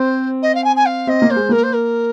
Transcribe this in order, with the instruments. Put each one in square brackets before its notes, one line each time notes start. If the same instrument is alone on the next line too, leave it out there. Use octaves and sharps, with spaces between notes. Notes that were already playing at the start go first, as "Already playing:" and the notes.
Already playing: [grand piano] C4 [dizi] C5
[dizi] D#5
F5
G#5
G#5
F5
[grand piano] C4 [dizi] D#5
[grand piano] A#3
[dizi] C5
[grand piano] G#3
[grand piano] A#3 [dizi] A#4
[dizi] C5
A#4